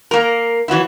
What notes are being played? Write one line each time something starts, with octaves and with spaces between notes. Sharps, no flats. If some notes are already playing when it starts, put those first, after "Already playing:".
A#3 A#4
E3 F#3 B3 E4